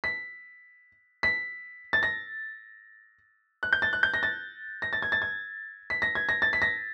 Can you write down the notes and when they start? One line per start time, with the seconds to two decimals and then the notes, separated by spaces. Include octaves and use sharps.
0.04 B6
1.23 B6
1.93 A6
2.03 A#6
3.63 F#6
3.73 G6
3.82 A6
3.93 F#6
4.03 G6
4.14 A#6
4.23 A6
4.82 A#6
4.93 A6
5.02 G#6
5.12 A6
5.22 G#6
5.90 B6
6.02 A#6
6.15 G#6
6.29 A#6
6.42 A6
6.53 B6
6.62 A#6